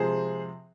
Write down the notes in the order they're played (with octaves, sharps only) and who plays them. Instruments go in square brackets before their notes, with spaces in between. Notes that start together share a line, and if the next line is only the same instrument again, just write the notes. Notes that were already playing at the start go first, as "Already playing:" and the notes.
Already playing: [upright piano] C3 F3 G#3 G#4 C5